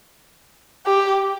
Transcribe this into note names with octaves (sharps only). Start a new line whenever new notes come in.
G4